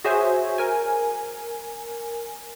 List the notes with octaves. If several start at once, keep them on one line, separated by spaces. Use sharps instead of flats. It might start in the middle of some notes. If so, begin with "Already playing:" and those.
F#4 G#4 C5 C#5 E5 G#5
A#4 G#5